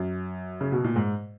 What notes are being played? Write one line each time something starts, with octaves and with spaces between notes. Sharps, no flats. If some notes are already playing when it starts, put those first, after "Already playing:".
Already playing: F#2
C#3
B2
A#2
G#2